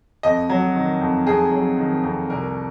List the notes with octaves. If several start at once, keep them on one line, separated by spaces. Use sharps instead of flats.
F2 D#5
F#3
D#3
F2
F2 G#4
F#3
D#3
F2
C2 A#4